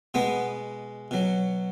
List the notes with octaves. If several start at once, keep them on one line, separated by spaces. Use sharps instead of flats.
B2 G#3 B3
B2 F#3